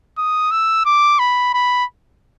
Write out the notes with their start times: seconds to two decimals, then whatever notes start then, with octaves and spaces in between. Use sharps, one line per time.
0.18 D#6
0.52 E6
0.86 D6
1.19 B5
1.54 B5